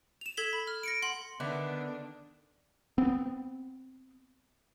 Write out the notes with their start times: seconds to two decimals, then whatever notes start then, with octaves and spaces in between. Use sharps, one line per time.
0.21 E7 F7
0.37 A4 G#6 B6 G7
0.53 B5
0.67 F6
0.83 A#6 C#7 D7
1.02 F#5 C6 F#7
1.40 D3 D#3 B3 D4 E5
2.98 B3 C4